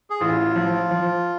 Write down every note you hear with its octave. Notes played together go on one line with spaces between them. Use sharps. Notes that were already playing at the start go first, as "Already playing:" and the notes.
G#4
A1 F4
F3
F3